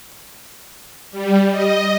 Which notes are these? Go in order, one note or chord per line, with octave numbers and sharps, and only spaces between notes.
G3
D#5